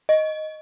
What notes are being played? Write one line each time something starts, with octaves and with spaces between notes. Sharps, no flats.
D#5